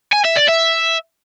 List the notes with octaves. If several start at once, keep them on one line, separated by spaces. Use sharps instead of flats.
G#5
E5
D5
E5